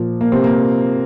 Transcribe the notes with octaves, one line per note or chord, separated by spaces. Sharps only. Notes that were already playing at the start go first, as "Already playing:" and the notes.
Already playing: A#2 F3
A#3
C3 C4
A#3